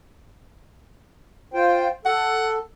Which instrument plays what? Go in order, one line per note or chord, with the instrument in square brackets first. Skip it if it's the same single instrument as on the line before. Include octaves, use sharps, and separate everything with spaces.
[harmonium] F4 C5 G5
[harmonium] A4 [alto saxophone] F#5